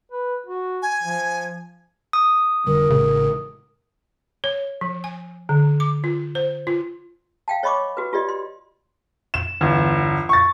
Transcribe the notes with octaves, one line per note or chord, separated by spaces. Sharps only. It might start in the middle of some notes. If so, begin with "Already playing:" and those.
B4
F#4
G#5
F3
D#6
F1 D3 G3 A#4
A1 A2 C#3 G#3
C#5
F3
G#5
D3
D6
F4
C5
F4
F5 G5 A5
C#5 D#5 B5 C#6 D6
F#4 B4
F4 G4 D5 D#5
C6
E7
G1 E2
C#6 A6